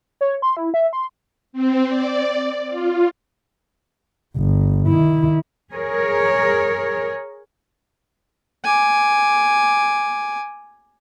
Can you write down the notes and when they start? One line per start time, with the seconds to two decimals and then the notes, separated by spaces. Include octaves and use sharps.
0.21 C#5
0.42 C6
0.57 E4
0.74 E5
0.93 C6
1.53 C4
1.88 D5
2.70 F4
4.36 G1
4.87 D#3 E4
5.72 G#4 A#4 C#5
8.64 G#5 D6